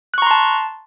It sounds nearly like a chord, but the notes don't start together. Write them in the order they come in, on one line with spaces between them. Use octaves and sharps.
F#6 C#6 A#5 C6 A5